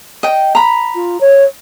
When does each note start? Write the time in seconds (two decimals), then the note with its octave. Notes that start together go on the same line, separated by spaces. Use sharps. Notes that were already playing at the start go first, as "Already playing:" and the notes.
0.23 D#5 G5
0.55 A#5 B5
0.95 F4
1.21 C#5